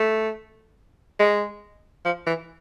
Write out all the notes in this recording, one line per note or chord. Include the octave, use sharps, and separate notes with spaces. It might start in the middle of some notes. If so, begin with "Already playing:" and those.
Already playing: A3
G#3
F3
E3